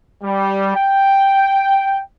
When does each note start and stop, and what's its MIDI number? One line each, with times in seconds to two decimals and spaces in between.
0.23 0.75 55
0.75 2.00 79